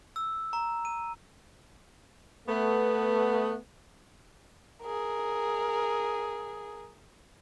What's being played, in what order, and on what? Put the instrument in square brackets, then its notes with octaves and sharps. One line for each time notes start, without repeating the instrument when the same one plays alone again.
[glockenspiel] E6
A#5
D#7
[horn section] A3 B3
[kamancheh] G#4 A#4